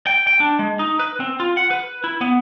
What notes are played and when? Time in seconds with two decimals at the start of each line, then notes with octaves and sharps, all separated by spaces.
0.07 G5
0.27 G5
0.40 D4
0.59 G#3
0.79 D#4
0.99 B4
1.20 C4
1.40 F4
1.57 F#5
1.71 B4
2.04 E4
2.21 B3